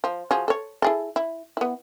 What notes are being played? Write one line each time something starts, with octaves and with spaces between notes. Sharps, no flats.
F3
F3 F#4 G#4
A4 C#5
E4 G#4 A4
E4
B3 E4